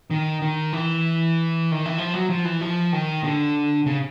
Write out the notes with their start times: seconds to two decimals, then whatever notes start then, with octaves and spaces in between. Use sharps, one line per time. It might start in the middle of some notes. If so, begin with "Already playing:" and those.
0.11 D#3
0.42 D#3
0.73 E3
1.72 D#3
1.85 E3
1.98 F3
2.14 F#3
2.30 F3
2.45 E3
2.61 F3
2.93 D#3
3.24 D3
3.86 C#3